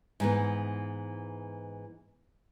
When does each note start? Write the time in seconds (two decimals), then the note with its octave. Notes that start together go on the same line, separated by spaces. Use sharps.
0.20 G#2 E3 B3